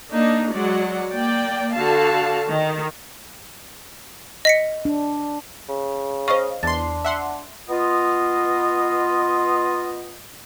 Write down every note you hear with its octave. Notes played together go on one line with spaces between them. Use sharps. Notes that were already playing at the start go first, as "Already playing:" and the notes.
A#3 D4 D#4
F#3 G#3 D5 F#5
A#3 D5 G5
D3 F#4 F5 A5
D#3
D#5 B6 C#7
D4
C#3
C5 D#5 F5 C#6
E2 D4 C6 A6
E5 F#5 C6
B3 F4 D#5